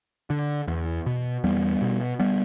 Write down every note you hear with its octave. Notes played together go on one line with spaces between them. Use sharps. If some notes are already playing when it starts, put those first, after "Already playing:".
D3
E2
B2
E2 G3 B3
B2
G3 B3